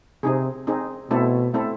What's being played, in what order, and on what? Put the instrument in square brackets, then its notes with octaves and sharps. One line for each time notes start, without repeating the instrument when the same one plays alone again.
[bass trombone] C3 [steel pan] C4 D#4 G#4
[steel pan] C4 D#4 G#4
[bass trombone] B2 [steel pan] A3 C4 E4 A4
[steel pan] A3 C4 E4 A4